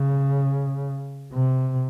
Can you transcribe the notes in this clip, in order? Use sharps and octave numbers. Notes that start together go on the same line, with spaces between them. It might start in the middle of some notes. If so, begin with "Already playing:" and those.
Already playing: C#3
C3